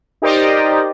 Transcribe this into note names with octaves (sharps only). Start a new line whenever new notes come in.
D#4 G4 A#4 C5 D5 D#5